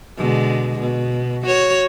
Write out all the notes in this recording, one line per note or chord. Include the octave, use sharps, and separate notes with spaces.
B2 D3 G#3
B2
F#4 C#5